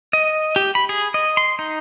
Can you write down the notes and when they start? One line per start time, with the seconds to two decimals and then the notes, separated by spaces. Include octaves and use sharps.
0.13 D#5
0.56 G4
0.75 B5
0.89 G#4
1.14 D#5
1.37 C6
1.59 D#4